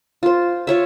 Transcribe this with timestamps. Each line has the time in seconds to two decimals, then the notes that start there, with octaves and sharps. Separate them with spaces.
0.23 F4 C5
0.67 F4 C#5 E5